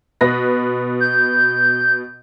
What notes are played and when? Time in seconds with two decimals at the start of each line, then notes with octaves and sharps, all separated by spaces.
0.21 B2 B4 A#6
1.00 G6